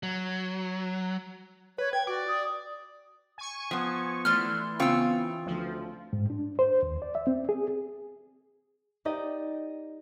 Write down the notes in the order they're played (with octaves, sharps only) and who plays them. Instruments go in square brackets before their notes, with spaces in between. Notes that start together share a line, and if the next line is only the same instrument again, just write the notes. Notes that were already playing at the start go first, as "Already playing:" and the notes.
[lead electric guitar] F#3
[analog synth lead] B4 [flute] C#5
[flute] G5 [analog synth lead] G#6
[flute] F#4 [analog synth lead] D5
[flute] D#6
[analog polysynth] G#5 C#6
[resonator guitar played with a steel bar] F3 B3
[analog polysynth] E3 [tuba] A3 [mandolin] D4 C6 F6
[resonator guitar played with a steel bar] C#3 C4 F4 [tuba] B3 [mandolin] C#6 E6
[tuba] D2 [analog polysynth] F3
[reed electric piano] G#2
D4
C5
D#2
D5
E5
C4
G#4
[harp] D#4 G4 D5 D#5